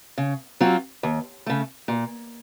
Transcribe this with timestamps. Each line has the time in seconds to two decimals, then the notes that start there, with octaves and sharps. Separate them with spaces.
0.18 C#3
0.60 F#3 C4 F4
1.03 D#2
1.46 C#3 A3
1.88 A#2